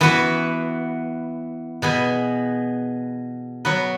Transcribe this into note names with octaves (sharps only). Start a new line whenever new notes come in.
E3 B3 F#4 B4
B2 B3 G#4 B4
F#3 B3 F#4 B4